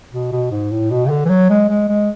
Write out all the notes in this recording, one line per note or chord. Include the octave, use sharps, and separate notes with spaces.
B2
B2
G#2
A2
B2
C#3
D3
E3
F#3
G#3
G#3
G#3